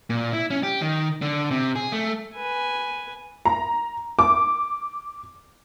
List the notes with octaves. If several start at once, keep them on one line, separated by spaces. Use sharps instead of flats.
A#2
E4
C#4
G4
D#3
D3
C3
G#4
A3
B4 G#5
A#5
D6